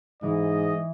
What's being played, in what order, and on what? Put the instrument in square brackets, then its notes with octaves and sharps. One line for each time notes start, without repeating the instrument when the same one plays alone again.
[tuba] G#2 [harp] E3 [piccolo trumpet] D#5